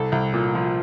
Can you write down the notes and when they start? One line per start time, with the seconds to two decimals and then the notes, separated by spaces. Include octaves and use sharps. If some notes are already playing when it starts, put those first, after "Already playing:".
Already playing: C2 A4
0.12 C2
0.33 A#2
0.55 F3